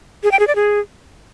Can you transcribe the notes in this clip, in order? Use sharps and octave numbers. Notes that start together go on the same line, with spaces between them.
G#4
G5
G#4
D5
G#4